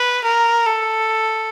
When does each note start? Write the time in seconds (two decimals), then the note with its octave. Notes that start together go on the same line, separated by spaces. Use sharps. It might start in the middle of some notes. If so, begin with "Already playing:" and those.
Already playing: B4
0.24 A#4
0.67 A4